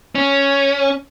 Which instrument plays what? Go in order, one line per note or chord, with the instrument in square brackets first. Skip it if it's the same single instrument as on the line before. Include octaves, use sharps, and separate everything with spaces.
[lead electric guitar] C#4